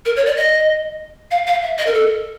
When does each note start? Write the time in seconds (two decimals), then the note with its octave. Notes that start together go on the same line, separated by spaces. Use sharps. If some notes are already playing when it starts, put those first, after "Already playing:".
0.06 A#4
0.16 C#5
0.26 D5
0.37 D#5
1.31 F5
1.47 F5
1.63 E5
1.78 D#5
1.87 A#4
1.94 A4